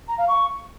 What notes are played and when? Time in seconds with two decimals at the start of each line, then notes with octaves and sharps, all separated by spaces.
0.08 A#5
0.18 F5
0.28 C#6